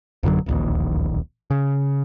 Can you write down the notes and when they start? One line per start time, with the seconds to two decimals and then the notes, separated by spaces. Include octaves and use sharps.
0.23 A1 F#2 D3 F#3
0.46 D1 A#1 D#2
1.50 C#3